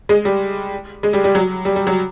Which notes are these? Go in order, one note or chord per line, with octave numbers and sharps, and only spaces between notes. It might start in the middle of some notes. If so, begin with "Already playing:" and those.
G#3
G3
G#3
G3
G3
F#3
G3
G3
F#3